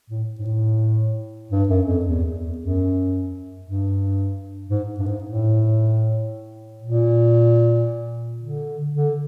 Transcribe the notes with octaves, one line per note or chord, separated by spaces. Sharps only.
A2
G#2
A2
G2
F#2
F2
E2
E2
F#2
G2
G#2
G2
G#2
A2
A#2
D3
D3